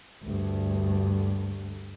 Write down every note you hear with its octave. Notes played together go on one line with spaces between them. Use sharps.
D2 G2